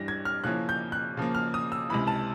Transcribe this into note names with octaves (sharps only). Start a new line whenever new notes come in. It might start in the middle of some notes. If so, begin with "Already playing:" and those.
Already playing: G2 E3 G3 A#6
G#6
F6
C#3 F3 A#3 C#4 E4 F#6
G6
F#6
C#3 F3 A#3
F6
D#6
E6
C#2 C3 E3 B5
A5